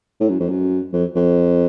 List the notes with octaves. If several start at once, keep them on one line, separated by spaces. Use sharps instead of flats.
A2
F#2
F2
F#2
F2
F2